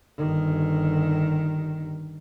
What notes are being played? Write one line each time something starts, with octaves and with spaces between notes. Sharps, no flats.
G1 D#3